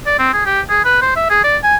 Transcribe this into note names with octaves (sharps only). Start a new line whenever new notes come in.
D5
C4
G#4
G4
G#4
B4
C5
E5
G#4
D5
G#5